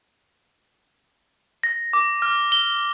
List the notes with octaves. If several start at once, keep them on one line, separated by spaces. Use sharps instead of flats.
A#6
D6
F6
G7